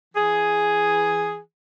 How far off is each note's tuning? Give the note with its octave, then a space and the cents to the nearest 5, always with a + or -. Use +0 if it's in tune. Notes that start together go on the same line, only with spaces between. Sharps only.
E3 +0 G#4 +0